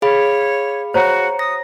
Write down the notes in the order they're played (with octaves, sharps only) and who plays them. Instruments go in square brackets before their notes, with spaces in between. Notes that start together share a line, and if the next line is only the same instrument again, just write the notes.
[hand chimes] G#4 F5 B5 [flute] C#5
[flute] F#4 [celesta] C5 C#5 A#5
[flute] D#6 [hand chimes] A#6